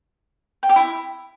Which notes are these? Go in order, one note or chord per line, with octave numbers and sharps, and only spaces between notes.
G5
G4
E4